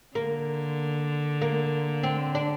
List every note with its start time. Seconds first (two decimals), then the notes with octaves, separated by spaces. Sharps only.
0.15 D3 A#3
1.42 A#3
2.03 C4
2.35 D4